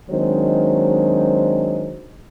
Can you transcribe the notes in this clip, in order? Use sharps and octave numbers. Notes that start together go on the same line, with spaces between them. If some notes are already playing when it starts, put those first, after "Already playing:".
D#3 F#3 G#3 C4 D4 C5